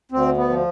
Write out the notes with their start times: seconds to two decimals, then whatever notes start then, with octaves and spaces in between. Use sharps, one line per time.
0.11 D2 C4
0.37 B3
0.50 F3